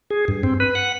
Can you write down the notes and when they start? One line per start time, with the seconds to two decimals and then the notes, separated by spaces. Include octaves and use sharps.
0.10 G#4
0.28 G2
0.43 C4
0.60 B4
0.75 F#5